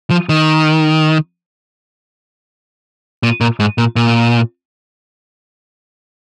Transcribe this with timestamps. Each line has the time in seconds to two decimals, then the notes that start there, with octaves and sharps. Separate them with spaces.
0.10 F3
0.29 D#3
3.23 A#2
3.41 A#2
3.60 G#2
3.78 A#2
3.96 A#2